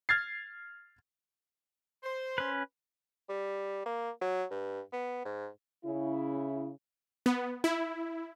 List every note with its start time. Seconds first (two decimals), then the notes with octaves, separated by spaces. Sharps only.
0.09 F6 G#6 A6 C7
2.04 C5
2.38 C#4 B4
3.29 G3
3.86 A#3
4.21 F#3
4.51 G2
4.93 B3
5.25 G#2
5.84 C#3 E4
7.26 B3
7.64 E4